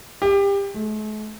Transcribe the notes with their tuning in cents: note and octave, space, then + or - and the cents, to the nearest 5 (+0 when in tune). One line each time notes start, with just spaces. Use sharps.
G4 +25
A3 -45